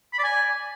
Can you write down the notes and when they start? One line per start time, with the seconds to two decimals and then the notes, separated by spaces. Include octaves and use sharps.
0.13 B5
0.18 D5
0.23 G#5